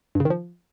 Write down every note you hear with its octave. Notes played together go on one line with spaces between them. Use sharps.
G2
C#3
D#3
F3